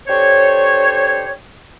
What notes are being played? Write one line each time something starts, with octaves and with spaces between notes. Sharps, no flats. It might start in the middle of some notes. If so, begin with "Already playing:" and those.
D4 G4 A4 C5 C#5